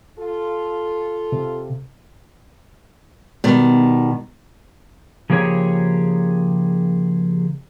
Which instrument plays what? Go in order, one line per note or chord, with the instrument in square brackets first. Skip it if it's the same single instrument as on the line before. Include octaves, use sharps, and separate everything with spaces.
[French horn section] F4 A4
[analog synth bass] C3
[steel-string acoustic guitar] B2 D#3 G3
[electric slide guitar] C#3 F3 A#3 G4 G#4 C#5